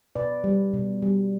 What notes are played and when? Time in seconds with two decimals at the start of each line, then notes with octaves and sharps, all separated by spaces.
0.15 B2 B4 D5
0.44 G3
0.74 B2
1.02 G3